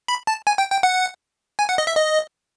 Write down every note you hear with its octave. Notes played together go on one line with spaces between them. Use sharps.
B5
A5
G#5
G5
G5
F#5
G#5
F#5
D#5
E5
D#5